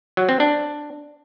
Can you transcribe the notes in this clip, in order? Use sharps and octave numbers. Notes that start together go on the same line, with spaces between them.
F#3
C4
D4